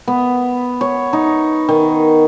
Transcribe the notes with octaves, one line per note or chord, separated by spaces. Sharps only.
B3
C#5
D#4
D#3